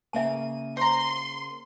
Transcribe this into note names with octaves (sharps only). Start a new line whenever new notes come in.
C#3 A#3 E5 G#5 D#7
C5 A#5 C6